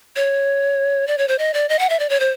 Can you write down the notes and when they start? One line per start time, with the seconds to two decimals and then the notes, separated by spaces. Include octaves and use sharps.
0.16 C#5
1.07 D5
1.18 C#5
1.28 C5
1.39 D#5
1.54 D5
1.69 D#5
1.79 F#5
1.89 E5
1.99 D5
2.09 C#5
2.20 C5